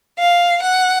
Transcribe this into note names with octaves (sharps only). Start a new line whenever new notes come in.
F5
F#5